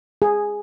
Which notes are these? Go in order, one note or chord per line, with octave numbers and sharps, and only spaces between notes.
G#4